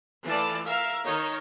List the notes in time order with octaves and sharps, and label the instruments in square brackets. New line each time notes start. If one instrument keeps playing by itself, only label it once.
[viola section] E3 A3 F4 D5 A5
A#4 E5 F5
D#3 D#4 A#4 C#5 D#5